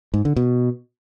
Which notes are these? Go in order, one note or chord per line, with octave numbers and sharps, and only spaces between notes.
G#2
D3
B2